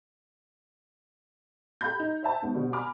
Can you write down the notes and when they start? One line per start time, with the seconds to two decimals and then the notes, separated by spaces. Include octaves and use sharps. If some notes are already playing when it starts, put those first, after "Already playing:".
1.81 G4 A4 F5 A#5 B5 G6
2.00 D#4
2.23 C5 E5 A5
2.42 D#2 G#2 B3
2.54 B2 D3 G3 B3 C4 F#4
2.73 G#5 A#5 B5 D6 F6